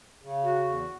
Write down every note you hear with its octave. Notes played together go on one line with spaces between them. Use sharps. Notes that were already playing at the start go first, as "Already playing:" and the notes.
C#3
F#4
E2